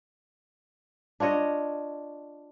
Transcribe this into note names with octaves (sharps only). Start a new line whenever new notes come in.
D4 F4 C#5 D#5